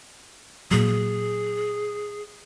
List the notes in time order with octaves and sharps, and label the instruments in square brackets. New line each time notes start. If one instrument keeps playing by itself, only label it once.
[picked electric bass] A#2 F#3 [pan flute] G#4